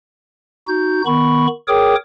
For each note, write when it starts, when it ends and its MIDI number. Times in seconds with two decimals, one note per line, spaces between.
0.68 1.02 63
0.68 1.02 66
0.68 1.02 91
1.06 1.47 51
1.06 1.47 59
1.06 1.47 83
1.06 1.47 85
1.68 1.95 68
1.68 1.95 70
1.68 1.95 73
1.68 1.95 79
1.68 1.95 86
1.68 1.95 87